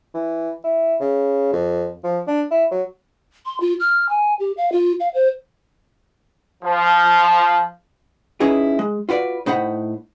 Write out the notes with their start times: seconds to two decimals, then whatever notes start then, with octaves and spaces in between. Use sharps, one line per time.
0.14 E3
0.64 E4
1.00 C#3
1.53 F2
2.04 F3
2.27 D4
2.51 E4
2.71 F#3
3.46 C6
3.60 F4
3.80 F6
4.09 G#5
4.39 G4
4.57 F5
4.72 F4
5.00 F5
5.14 C5
6.63 F3
8.40 C#4 D#4 E4 G#4 B4
8.79 G#3
9.09 F4 F#4 B4 D5
9.46 A2 D#4 C5 F#5 B5